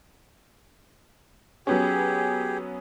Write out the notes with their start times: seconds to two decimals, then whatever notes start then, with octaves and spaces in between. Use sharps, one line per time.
1.67 F#3 B3 C#4 G4 G#4